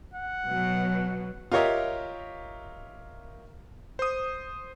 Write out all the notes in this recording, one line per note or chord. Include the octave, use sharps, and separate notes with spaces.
F#5
B2 F#3
F4 G4 A#4 C#5 D#5 E5
C5 D#6